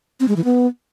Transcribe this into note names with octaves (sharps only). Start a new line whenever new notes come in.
C4
G#3
E3
B3